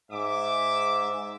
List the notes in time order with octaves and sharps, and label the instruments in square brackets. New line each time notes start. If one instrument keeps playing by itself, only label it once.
[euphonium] G#2 [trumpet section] E5 D6